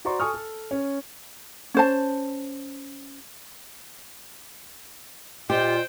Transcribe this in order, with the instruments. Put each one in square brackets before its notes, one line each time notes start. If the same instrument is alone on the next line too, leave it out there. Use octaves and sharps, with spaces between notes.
[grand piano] F#4 C5 D5 A#5 C6 C#6
A4 G#5 C#6 D#6 F6
A4
C#4
[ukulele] C#4 C5 A5
[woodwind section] A#2 F4 [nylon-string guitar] G4 [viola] C5 G5 [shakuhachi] D#5